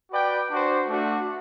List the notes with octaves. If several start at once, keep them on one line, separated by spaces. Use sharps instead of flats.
F#4 B4 D5 G5
D4 F#4 C5
A3 D4 F#4